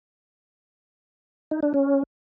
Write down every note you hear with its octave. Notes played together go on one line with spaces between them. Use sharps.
D#4
D4
C#4